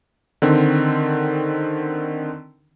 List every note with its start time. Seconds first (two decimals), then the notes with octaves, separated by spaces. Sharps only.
0.42 D3 D#3 C4